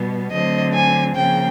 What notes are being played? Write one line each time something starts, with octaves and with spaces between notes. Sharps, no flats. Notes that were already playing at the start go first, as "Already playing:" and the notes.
Already playing: B2 G3 B3
D3 F#3 A3 C4 D#5
G#5
C#3 F3 A#3 G5